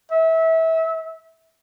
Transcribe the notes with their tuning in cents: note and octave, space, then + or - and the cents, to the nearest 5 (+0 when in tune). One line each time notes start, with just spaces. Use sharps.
E5 -25